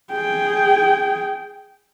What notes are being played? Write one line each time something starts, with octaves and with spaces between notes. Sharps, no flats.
G#4 G5